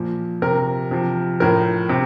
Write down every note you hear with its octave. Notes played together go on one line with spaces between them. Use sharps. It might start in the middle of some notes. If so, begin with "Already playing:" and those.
Already playing: A#2 F3
C3 F3 A#4
C3 F3
A2 F3 A#4
C3